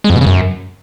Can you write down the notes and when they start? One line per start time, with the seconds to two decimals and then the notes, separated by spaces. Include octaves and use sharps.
0.04 G#3
0.10 F2
0.15 B2
0.21 C#3
0.27 F#2